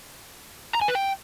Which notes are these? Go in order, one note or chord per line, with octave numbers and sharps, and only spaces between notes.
A#5
G#5
B4
G5